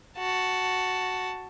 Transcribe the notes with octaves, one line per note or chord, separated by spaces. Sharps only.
F#4 A5